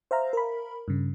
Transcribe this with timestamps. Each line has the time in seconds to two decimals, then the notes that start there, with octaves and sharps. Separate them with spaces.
0.11 C5 E5 F5 A#5
0.33 A#4 B5
0.88 G2 C#3